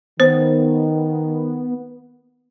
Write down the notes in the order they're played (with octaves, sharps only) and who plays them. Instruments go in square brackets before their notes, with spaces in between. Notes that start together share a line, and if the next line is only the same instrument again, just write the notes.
[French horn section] D#3 [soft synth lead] B3 [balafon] C5